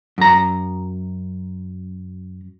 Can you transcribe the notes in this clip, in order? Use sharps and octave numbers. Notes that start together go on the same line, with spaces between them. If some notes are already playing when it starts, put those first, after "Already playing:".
F#2 A#5